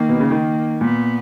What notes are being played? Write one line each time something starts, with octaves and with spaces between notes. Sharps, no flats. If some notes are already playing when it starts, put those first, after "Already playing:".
Already playing: D#3 A#3
B2
C#3
D#3
A#2 B3